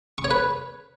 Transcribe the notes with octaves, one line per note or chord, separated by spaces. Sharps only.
C#6
C#5
B4